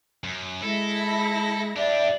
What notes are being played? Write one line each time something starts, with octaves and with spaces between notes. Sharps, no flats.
F#2
G#3 E4 A4 A#6
D4 G4 D5 E5